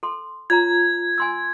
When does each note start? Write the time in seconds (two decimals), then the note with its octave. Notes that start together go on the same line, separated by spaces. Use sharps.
0.03 A4 C6
0.50 F4 C#5 A#5 G#6
1.18 G#5 C6 E6